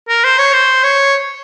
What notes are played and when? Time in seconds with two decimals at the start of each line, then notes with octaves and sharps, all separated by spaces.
0.09 A#4
0.24 C5
0.38 C#5
0.53 C5
0.84 C#5